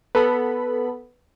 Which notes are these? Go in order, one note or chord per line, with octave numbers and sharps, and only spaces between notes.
B3 A4 B5